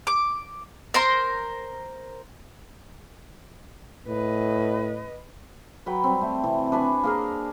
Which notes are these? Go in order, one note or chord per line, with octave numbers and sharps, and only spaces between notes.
D6
A#4 C5 C6
A2 B4 D#5
F#3 B4 G5
G3 C4
A3
C3 E3
D4 B4 G#5 C#6
A#3 G#4 A#4